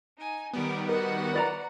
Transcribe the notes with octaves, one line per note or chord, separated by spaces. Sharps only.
D#4 G#5
D#3 G3 B3 A#4 D6
F#4 A#4 F#5
B4 D5 A#5